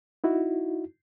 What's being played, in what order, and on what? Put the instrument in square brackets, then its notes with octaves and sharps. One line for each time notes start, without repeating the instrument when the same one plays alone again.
[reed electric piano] D#4 E4 F#4